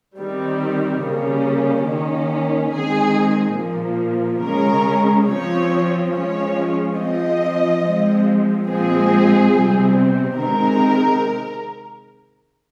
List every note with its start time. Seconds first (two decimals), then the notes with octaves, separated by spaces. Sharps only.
0.19 D#3 G3 C4
1.04 C#3 G3 A#3 C#4
1.88 D#3 A#3 C#4
2.73 D#3 G#3 C4 G#4
3.58 A#2 F3 A#3
4.43 C#3 G#3 C#4 A#4
5.28 F3 C4 C#5
6.13 F3 G#3 C#4 C#5
6.98 F3 C4 D#5
7.84 F3 G#3 C4
8.68 A#2 F3 G#3 C4 G#4
9.53 C3 G3 C4
10.37 C3 D#3 G#3 C4 A#4